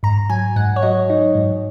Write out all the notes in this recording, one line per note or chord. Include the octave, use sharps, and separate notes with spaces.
G#2 A#5
F#3 G#5
G#2 F#5
C#5
F#3 D#5
D#4
G#2